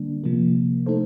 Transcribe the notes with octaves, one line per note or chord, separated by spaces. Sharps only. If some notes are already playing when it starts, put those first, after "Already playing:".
Already playing: D3 G3 A#3 D4
C3 F3 A#3
A3 D#4 A4 C5